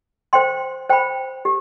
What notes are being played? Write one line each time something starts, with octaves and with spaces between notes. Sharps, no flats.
C5 G5 C6
C5 G5 B5
G4